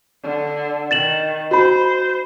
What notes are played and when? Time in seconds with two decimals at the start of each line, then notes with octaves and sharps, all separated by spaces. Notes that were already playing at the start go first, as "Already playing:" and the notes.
0.23 D3
0.91 D#3 A6 E7 F#7
1.51 F#4 C5 B5